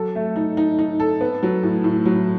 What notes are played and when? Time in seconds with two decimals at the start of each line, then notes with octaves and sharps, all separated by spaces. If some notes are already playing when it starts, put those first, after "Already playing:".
Already playing: F#3 A4
0.15 A3
0.36 D#4
0.57 D#4
0.79 D#4
1.00 A4
1.21 B3
1.43 F#3
1.63 A2
1.84 A2
2.05 F#3